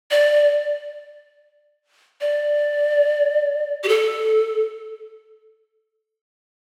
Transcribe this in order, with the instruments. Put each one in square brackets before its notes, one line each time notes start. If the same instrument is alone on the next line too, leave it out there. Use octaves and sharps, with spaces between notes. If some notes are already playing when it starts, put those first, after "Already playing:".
[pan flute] D5
D5
G4
A4